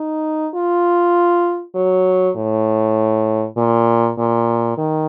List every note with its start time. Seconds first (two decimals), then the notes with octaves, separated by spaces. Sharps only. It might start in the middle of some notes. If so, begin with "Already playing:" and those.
Already playing: D#4
0.54 F4
1.75 F#3
2.36 A2
3.57 A#2
4.18 A#2
4.78 D#3